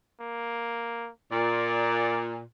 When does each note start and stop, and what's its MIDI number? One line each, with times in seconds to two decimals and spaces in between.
0.21 1.10 58
1.32 2.41 46
1.32 2.25 74